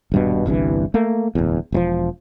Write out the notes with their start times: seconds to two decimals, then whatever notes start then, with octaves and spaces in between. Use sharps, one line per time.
0.12 D#1 G2 B2
0.46 G1 C2 G2 E3
0.94 A3 A#3
1.35 D1 E2
1.72 E1 B2 F3